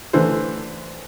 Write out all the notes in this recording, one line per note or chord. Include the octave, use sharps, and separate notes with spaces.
D3 E3 A3 C5